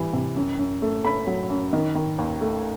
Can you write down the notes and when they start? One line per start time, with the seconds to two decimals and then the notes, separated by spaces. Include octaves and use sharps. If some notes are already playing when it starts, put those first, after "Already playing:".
Already playing: E3 G3
0.13 C3
0.36 F#2
0.59 F#2
0.82 A3
1.04 A3 B5
1.27 F#3
1.50 F#2
1.73 D#3
1.95 D#3
2.18 D#2
2.41 A3